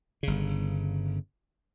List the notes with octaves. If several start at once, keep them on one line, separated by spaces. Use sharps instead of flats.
G1 C#3